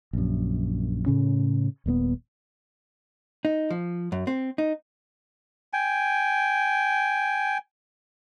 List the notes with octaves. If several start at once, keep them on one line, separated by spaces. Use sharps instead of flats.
A#1 F#2
A2 C#3 C#4
D#1 A#2 A#3 B3
D#4
F3
F#2
C4
D#4
G5 G#5